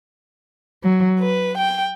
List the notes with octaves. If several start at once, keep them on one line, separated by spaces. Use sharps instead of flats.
F#3
B4
G5